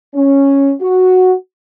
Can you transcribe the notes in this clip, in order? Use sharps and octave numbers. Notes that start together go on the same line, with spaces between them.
C#4
F#4